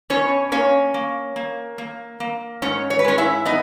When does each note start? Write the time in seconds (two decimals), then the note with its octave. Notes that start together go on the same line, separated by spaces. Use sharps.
0.10 B2 C#4 C#5
0.52 A#3 C#4 C#5
0.94 A#3
1.36 A#3
1.78 A#3
2.20 A#3
2.62 G#2 C#4 C#5
2.90 C#5
2.99 B4
3.04 G#3 C#4 C#5
3.18 E4 E5
3.45 B3 D#4 D#5